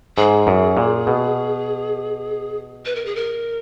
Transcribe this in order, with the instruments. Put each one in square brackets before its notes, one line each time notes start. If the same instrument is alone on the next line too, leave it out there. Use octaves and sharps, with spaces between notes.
[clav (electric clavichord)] G#2 [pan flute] G#4
[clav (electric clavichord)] F#2
A#2
B2
[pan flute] B4
A#4
G#4
A#4